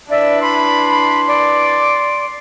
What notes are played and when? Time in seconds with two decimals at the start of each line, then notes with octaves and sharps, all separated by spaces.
0.11 D4 E4 B4 D5 E5
0.42 B5 C6
1.28 D5